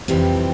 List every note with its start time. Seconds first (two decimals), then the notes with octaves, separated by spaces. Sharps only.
0.08 F2 C3 E3 G3 C4